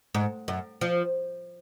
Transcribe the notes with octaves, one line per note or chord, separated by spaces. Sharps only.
G#2
F#2
F3